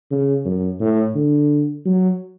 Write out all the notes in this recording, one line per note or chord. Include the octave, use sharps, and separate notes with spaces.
C#3
F#2
A2
D3
F#3